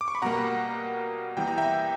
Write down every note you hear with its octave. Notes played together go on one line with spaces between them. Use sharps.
D6
C#6
B5
B2 G3 A#3 F#5 A#5
E3 G3 B3 G5
A#5
E5 G5